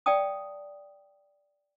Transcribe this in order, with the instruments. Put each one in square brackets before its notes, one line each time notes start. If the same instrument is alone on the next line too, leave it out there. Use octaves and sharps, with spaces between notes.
[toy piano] D5 F5 G5 A5 D#6